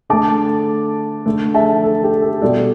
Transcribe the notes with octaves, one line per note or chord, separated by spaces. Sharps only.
D3 A3 A5 D6
D3 A3
E5 A5
A4
G4
A4
B2 G3 A4 D5